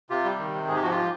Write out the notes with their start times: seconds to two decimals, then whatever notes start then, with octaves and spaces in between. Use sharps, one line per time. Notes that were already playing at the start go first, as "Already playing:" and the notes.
0.10 C3 F4 G4
0.25 G3
0.39 D#3
0.53 C3
0.68 G#2 G#4
0.76 G4
0.82 F3 F#4
0.90 F4 G4
0.97 F3